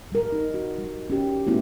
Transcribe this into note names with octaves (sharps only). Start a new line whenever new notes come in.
G3 A#4
D#4
F#4
G3
C#4 G4
G3 A3 B3 C#4 E4 F#4